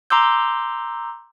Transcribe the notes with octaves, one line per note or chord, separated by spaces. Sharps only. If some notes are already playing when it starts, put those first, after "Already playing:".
A#5 C6 D6 E6 G6